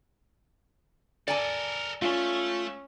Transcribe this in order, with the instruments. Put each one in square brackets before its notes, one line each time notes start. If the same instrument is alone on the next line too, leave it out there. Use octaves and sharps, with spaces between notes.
[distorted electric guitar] A4 A#4 [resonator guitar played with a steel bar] D5 G#5 A5
[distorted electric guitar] A3 [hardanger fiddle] C#4 [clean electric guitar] F4